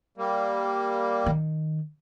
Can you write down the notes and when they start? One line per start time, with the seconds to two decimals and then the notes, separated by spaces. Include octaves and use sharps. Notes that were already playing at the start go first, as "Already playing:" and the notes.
0.18 G3 A#3
1.26 D#3